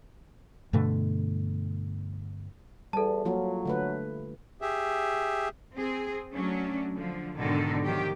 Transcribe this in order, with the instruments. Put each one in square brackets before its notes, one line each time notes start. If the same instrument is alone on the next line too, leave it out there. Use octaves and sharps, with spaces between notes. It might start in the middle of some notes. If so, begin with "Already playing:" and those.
[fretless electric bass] G2 B2 D3 A3
[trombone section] E2 [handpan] G3 [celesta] A4 A5
[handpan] F3 A#3 F4 [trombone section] F#3
[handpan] D3 A3 B4
[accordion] G4 G#4 E5
[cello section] C4 G#4
F#3 A3 C#4 D4
D3 F3
G#2 B2 D3 D#3 D#4 A4
D#3 F3 F#3 G4